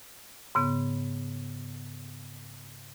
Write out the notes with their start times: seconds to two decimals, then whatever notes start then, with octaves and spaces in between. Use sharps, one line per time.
0.55 G#2 C#3 B3